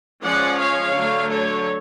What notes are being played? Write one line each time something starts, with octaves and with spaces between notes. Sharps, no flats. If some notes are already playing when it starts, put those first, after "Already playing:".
F3 G#3 C#4 D5 F#5
C#5 F5
D3 F#3 A3
A4 C#5